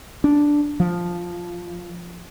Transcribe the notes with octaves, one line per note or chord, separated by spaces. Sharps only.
D4
F3